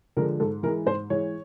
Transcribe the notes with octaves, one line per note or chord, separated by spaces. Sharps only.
D3 F3 G#3 A#4
G#2 A4
E3 G#3 A#4
G#2 C5
E3 G#3 C#5